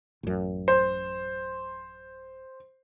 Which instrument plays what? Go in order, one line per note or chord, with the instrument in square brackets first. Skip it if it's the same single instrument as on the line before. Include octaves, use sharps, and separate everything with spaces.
[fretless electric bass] A1 F#2
[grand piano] C5